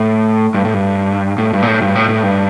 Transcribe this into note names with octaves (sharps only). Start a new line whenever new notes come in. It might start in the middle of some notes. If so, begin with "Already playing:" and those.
Already playing: A2
G2
A2
G2
A2
G2
A#2
A2
G2
A2
A2
G2